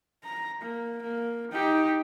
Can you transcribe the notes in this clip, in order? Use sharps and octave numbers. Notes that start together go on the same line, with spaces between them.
A#5
A#3
A#3
D#4 G4